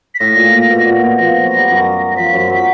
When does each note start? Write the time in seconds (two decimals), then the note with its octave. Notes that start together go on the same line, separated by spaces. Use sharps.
0.15 B6
0.19 A2 A#6
0.36 A#2
0.53 A#2
0.70 B2
0.86 A#2
1.02 B2
1.18 F3 A#6
1.43 F#3
1.56 G3
1.70 F#2 F#3
2.12 A#6
2.16 F3 B6
2.33 F#2 F#3
2.50 F#3
2.55 B6